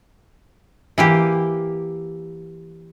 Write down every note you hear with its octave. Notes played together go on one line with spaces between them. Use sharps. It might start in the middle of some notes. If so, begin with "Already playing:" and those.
E3 A#3 G4